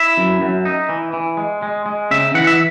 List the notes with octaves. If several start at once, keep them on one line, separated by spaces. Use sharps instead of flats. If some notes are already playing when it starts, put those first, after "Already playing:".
Already playing: E4 E5
F#2
F#2
D#4
E3
E3
G#3
G#3
G#3
C#3 E5
E3 F#5
E5